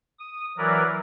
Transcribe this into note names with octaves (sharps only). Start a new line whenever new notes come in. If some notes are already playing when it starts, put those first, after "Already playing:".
D#6
E3 F#3 A#4 B4 D5